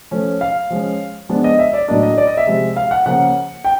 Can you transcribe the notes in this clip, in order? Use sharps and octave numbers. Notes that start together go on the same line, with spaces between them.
F3 A3 C#4
F5
F3 G#3 C#4
F3 G#3 B3 D4
D#5
E5
D5
A2 F#3 A#3 D4 D#5
D#5
D5
D#5
E5
C3 F3 G#3
F5
F#5
C#3 F3 A#3 C#4 F#5
G5